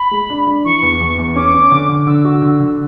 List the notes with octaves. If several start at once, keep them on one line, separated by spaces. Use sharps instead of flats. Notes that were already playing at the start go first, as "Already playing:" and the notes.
Already playing: B5
G#3
D4
D4
E3 C#6
E2
E2
E2
C#4 D6
C#4
D3
D3
D3 E6
F#4
D3
D3